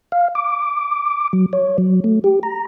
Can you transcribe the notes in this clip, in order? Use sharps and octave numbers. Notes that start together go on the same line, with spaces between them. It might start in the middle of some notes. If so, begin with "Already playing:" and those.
F5
D6
F#3
C#5
F#3
A3
G4
A#5